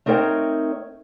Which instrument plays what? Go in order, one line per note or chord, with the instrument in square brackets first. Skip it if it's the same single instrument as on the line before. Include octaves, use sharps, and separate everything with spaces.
[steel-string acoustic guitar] A3 C4 D#4 A#4 C#5 G5